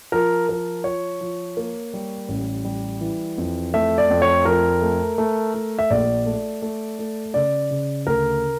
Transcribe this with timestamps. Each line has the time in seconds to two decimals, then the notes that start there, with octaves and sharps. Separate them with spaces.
0.12 F3 A#4
0.49 F3 A#4
0.84 F3 C#5
1.21 F3
1.57 A#3
1.94 G3
2.29 A1
2.65 G3
3.01 E3
3.38 F2
3.74 A3 E5
3.98 D5
4.10 F2
4.22 C#5
4.45 F3 A#4
4.82 A3
5.18 A3
5.54 A3
5.79 E5
5.91 A#1 D5
6.26 A3
6.62 A3
6.99 A3
7.34 C#3 D5
7.71 C#3
8.07 D2 A#4